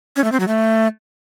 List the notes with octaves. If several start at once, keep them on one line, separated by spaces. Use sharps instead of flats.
C#4
A3
C4
F#3
A3